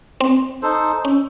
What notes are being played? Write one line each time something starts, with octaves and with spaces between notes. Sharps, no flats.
C4
D#4 A4 C5
C#4